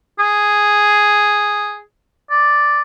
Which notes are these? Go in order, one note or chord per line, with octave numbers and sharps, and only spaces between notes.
G#4
D5